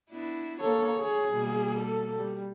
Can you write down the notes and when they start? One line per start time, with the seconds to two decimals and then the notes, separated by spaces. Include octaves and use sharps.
0.11 B3 D4 E4
0.61 A#3 A4 C#5
0.97 G#4
1.29 B2 G3 A#3
1.80 A4
2.18 G3